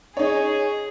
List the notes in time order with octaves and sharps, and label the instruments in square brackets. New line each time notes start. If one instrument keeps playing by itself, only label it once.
[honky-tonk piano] D#4 C#5 [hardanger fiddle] G#4